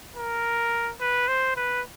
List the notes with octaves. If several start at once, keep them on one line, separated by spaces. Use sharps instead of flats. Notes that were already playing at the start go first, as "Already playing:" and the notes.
A#4
B4
C5
B4